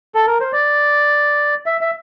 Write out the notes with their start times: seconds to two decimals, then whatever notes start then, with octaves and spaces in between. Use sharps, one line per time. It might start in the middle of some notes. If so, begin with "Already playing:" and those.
0.15 A4
0.27 A#4
0.41 C5
0.53 D5
1.66 E5
1.81 E5